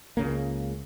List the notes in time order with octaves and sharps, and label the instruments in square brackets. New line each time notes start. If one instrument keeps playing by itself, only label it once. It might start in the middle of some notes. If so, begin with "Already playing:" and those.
[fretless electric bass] C#2 C#3 A#3